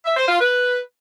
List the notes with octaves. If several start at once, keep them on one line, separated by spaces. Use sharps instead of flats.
E5
C5
F4
B4